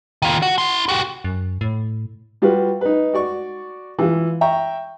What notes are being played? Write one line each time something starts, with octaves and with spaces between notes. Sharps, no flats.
D#3 F4
F#4
E4 C6
F#4 G4
F#2
A2
G3 F4 F#4 B4
D#4 B4
F#4 D5 C#6
E3 F4
E5 G5 A#5 C#6